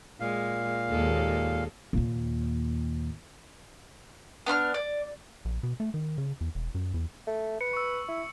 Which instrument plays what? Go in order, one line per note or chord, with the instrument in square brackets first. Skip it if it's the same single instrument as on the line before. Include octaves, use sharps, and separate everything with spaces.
[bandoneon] A#2 F5 [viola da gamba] G#3
[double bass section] D#2 [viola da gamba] G#3 A4
[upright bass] D#2 A#2
[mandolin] B3 D4 B5 F6
D5
[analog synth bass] A#1
B2
A3
D#3
C#3
E2
E1
F#2
E2
[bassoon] A3
[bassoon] B4 [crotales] C#7
[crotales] C#6 E6
[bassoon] E4